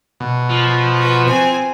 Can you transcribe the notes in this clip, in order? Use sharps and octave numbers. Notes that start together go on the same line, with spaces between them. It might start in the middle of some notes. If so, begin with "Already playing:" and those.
B2
F3
F#4 B4
C4 G#5